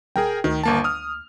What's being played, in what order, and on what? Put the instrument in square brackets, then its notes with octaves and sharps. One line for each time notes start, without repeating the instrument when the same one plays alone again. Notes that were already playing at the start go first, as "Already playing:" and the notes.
[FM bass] D#1 [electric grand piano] G#4 A#4 G5
[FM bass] D2 [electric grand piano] D#3
[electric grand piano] G1 A#3 A5
D#6 F6